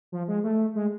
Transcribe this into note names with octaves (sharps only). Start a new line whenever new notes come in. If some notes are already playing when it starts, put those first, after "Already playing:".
F3
G#3
A3
G#3